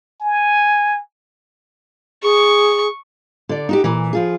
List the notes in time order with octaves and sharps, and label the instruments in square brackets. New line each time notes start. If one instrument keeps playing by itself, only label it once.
[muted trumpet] G#5
[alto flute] G#4 [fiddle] C#6
[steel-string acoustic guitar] D3 D5
D#4 F#4 G4
A#2 E3
F3 F4 G#4